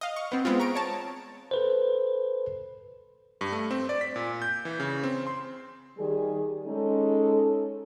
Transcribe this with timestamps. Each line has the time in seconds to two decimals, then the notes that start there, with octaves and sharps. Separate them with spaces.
0.01 D#5 F5
0.16 C#6
0.32 B3 C4
0.45 G#3 B3 C4 F4
0.60 A#5 C#6 D7
0.75 C#5 A5
1.51 A4 B4 C5
3.41 G2
3.52 A3
3.71 C4
3.89 D5
4.01 B6
4.16 A#2
4.42 G6
4.65 E3
4.80 C#3
5.03 C4
5.27 C6
5.98 D#3 G3 G#4
6.66 G#3 C#4 D#4 A4